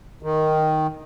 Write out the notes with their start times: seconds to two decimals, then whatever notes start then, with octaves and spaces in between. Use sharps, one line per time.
0.23 D#3